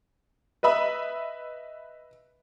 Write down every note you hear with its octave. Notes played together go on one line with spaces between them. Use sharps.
B4 D#5 E5 B5